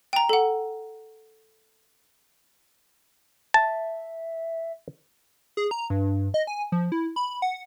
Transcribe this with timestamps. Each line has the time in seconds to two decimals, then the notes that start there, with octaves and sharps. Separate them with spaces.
0.13 G5 A#5
0.29 A4 F#5
3.54 E5 A5
5.57 G#4
5.71 A#5
5.90 G2
6.34 D#5
6.47 G#5
6.72 F3
6.92 E4
7.16 B5
7.42 F#5